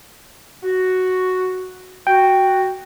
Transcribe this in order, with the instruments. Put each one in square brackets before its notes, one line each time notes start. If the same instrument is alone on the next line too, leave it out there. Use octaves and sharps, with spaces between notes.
[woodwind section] F#4
[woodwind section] F#4 [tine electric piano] G5